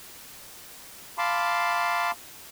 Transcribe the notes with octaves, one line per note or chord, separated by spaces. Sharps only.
F5 A5 B5 C6 D6